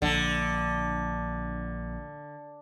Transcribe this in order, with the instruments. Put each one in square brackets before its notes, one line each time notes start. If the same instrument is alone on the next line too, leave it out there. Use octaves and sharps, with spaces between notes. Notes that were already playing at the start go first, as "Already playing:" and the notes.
[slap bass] A#1 [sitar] D3